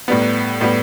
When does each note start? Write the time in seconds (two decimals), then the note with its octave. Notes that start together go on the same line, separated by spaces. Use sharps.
0.08 A2 G3 B3
0.61 A2 G3 B3